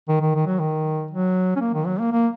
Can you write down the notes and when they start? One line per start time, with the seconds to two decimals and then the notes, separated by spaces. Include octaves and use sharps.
0.09 D#3
0.21 D#3
0.35 D#3
0.47 F#3
0.59 D#3
1.11 F#3
1.56 C#4
1.61 A#3
1.74 D#3
1.86 F#3
2.00 A#3
2.12 A#3